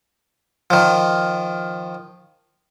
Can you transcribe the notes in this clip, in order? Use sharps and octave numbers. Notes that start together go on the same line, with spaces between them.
D#3 F3